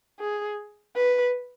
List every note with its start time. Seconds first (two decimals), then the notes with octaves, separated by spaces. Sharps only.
0.19 G#4
0.96 B4